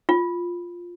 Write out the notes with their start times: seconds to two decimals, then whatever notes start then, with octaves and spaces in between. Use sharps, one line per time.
0.09 F4